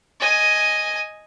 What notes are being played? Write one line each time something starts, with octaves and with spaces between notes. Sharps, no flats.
D#5 G#5